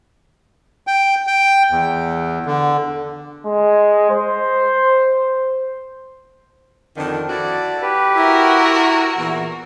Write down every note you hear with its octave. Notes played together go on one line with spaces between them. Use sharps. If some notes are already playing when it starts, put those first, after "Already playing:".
G5
G5
E2
D3
G#3
C5
F2 D3 D#3 D4
E4 F#4 A4 D5
G4 B4
E4 F#4 A#4
E6
E2 A#2 E3